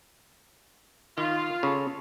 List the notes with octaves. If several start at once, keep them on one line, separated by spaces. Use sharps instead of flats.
D#3 F4
C#3 A4